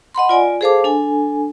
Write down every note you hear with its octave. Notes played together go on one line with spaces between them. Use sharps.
D#5 F#5 B5 C6
F4 D5 G#5
G#4 A4 C5 F5 A5 D6
D4 A4 G#5